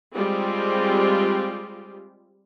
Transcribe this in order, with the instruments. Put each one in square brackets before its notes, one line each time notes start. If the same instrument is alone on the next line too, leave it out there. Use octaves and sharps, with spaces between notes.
[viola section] G3 G#3 C4 F4 G4